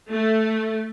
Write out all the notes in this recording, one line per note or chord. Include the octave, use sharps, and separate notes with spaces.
A3